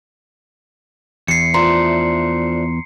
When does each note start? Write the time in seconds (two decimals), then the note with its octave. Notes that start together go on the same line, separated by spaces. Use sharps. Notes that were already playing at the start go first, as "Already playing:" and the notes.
1.28 E2 C7 C#7
1.54 F3 A3 D4 A#5 C6